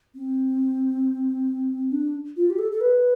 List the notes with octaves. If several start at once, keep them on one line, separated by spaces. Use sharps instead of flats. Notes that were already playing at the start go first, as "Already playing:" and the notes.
C4
D4
F4
G4
A4
A4
B4